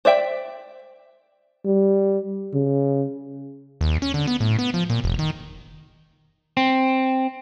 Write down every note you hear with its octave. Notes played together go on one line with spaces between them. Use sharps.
C5 D5 E5 G5
G3
C#3
D#2
C#4
D3
B3
A2
B3
F3
A#2
F1
D#3
C4